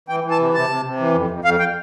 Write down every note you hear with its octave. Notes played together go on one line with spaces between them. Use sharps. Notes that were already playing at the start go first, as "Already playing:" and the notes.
E3 G5
E3
A5
C3
C3 A5
C3
C3
E3
F2
F2
F2 F5
G5